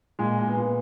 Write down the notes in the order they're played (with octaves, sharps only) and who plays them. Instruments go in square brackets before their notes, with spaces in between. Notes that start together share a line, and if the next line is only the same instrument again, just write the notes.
[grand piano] A#2 [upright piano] G#3
[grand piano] A#2
[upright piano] B3
[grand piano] A#2